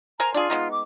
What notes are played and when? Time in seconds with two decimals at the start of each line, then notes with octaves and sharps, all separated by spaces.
0.20 A#4 C5 G#5 A#5
0.34 D4 F4 G#4
0.50 G#3 B3 D#4
0.71 D6